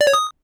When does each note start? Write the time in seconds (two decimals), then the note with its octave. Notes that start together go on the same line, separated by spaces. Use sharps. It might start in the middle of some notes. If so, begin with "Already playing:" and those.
0.01 D5
0.07 C#5
0.14 D#6